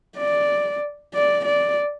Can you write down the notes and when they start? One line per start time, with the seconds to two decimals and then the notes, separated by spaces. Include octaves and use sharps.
0.17 D5
1.14 D5
1.45 D5